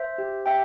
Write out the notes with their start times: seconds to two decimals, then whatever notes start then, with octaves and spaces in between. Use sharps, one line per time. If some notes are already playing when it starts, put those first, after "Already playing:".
Already playing: C5 E5
0.18 G4
0.46 G4 E5 G5